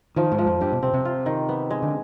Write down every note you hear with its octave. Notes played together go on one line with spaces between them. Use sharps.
D#3 F3
G#2
F3
F2
G2 G4
B2
C3 C4
C3
F4
D#3
B3
G#3
D3